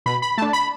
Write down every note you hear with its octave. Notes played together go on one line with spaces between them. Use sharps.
B2 B5
B5
A3 D4 A5
B5